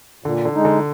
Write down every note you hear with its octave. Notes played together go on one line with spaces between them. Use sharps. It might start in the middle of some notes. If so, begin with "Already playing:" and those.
A#2 D3
D3
G#3 D#4
D3